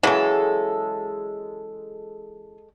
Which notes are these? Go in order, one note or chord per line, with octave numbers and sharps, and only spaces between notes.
C#3 E3 F#3 G#3 A4